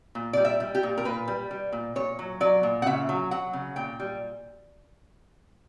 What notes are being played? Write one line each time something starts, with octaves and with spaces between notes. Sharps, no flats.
A#2
G3 D5
E5
G3
G4
A#2
A#4
A#2 B4
G3
G3
A#2
A#2 C#5
F#3
F#3 D5
A#2
F#5
C#3 E5
F#3
F#3 F#5
C#3
A#2 G5
G3